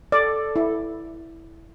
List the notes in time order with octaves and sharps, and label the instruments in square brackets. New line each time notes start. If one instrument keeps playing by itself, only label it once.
[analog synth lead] A4 [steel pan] D5
[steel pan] E4